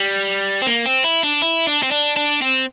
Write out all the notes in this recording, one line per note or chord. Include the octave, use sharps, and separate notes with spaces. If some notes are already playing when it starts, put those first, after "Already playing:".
Already playing: G3
C4
A#3
C4
E4
D4
E4
D4
C4
D4
D4
C4